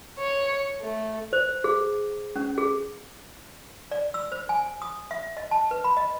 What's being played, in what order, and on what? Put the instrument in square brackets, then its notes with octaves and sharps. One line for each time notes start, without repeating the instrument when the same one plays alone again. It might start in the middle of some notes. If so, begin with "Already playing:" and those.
[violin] C#5
A3
[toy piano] C5
G#4
C#4
G#4
D5
E6
C5
G#5
D#6
E5
D#5
A5
B4
B5
D#5